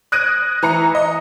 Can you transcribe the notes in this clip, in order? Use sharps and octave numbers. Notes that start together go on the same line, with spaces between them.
D#6 F#6 G#6 A#6 D7 D#7
E3 A#5 C#7
D#5